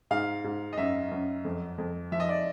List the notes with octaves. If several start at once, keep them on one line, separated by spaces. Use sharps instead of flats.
G#2 F5
G#2
D#5
F#2 E5
F#2
F2
F2
F3 E5
D#5
D5